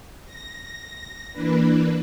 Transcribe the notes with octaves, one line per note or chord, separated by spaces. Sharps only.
A#6
E3 A#3 D4 B4